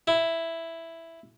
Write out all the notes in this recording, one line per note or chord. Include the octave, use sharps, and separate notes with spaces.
E4